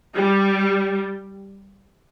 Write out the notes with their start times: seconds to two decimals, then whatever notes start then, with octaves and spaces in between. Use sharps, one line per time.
0.14 G3